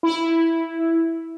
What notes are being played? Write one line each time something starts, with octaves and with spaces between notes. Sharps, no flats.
E4